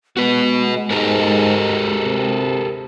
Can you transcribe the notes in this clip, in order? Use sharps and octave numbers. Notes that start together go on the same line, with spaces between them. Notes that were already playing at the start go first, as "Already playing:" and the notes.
G#3 B3 F#4 B4
G#2 G4 A4 A#4
C3